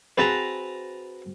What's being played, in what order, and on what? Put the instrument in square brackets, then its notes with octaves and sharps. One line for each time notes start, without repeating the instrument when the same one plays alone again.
[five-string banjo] C4 F#4 G#4 [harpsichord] B4 A5 A#5